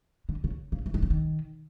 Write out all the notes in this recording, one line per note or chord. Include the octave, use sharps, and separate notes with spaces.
D3
C#3
C#3
E3
D#3
D3
D#3